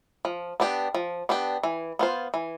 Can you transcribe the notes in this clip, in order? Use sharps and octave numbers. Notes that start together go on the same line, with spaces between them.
F3
B3 D4 G4
F3
B3 D4 G4
E3
B3 F4 C5
E3